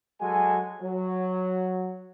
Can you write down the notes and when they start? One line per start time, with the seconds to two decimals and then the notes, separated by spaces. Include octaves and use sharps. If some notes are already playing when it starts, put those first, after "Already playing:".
0.21 F#3 G#3 F#4 A4 G#5
0.82 F#3